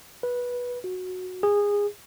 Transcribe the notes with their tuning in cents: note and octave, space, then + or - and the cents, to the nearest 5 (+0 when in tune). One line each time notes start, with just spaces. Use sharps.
B4 -15
F#4 -10
G#4 -20